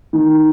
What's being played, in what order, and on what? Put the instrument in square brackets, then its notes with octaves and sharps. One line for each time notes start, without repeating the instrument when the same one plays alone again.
[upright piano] D#3